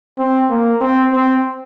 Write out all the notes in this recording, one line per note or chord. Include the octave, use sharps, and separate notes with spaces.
C4
A#3
C4
C4